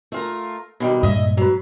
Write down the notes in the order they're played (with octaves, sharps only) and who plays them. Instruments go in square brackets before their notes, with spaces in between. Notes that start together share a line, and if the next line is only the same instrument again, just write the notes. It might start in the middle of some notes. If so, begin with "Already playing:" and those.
[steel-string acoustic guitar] A3 F4 A#4
B2 D#3 G3
[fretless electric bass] G2 A#2 G#3 [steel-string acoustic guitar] D#5 E5
[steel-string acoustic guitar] F#3 B4